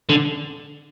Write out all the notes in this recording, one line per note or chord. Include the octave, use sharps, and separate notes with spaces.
D3